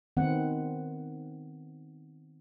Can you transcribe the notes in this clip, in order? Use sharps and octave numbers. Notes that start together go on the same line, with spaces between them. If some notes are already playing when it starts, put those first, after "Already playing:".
D#3 B3 C4 F#5